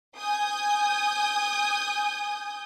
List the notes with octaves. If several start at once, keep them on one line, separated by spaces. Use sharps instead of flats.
G#5 D#6 G6